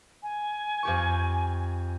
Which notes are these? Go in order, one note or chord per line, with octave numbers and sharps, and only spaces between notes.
G#5
F2 G4 C#6